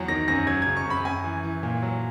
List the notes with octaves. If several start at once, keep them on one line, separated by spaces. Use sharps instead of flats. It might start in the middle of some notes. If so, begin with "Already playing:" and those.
Already playing: E2 F#3
D#3 A#6
F#2 A#6
F#3 G#6
G#6
C#3
C#6
F#2 B5
F#2 G#5
E3
E3
A#2
F#3